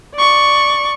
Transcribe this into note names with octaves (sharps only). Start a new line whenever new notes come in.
D5 C#6